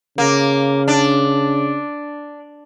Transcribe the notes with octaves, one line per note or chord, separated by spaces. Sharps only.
C#3 A#3
D4